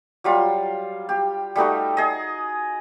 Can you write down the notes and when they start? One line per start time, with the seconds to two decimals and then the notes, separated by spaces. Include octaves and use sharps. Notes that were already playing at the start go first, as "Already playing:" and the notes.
0.24 F#3 G3 F4
1.09 G4
1.56 G3 A3 D#4 F#4
1.97 G#4 D#5